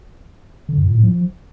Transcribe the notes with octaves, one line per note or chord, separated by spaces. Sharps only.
D3
F#2
A#2
A2
F3